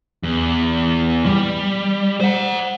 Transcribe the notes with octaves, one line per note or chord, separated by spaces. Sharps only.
E2
G3
C5 F#5